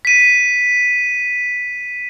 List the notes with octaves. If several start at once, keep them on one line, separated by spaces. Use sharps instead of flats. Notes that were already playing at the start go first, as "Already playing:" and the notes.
B6 D#7